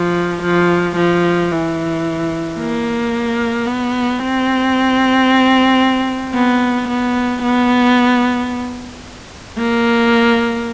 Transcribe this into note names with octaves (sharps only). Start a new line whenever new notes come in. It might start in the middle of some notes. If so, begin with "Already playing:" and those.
Already playing: F3
F3
F3
E3
A#3
B3
C4
B3
B3
B3
A#3